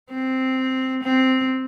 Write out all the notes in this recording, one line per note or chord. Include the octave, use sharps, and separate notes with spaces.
C4
C4